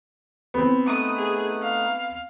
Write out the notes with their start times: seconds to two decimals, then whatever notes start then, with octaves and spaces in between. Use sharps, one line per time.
0.54 B3 C4
0.86 A3 D#4 F#5 D#6
1.16 G#4
1.62 F5